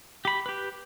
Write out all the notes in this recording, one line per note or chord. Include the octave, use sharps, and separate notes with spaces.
G4 B5
G4 B4